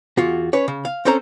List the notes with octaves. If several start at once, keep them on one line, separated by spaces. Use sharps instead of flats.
E2 F4 F#4
C#4 B4 C#5
C#3
F5
C4 C#4 A4 C5 A#5